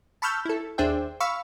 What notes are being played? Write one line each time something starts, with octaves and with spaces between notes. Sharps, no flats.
A5 B5 C#6 E6 F6 G6
E4 A4
D#2 D4 G#4 C5 E5 G5
F5 B5 C#6 E6